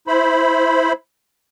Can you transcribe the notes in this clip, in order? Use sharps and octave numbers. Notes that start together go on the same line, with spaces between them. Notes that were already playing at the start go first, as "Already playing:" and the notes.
E4 C5 B5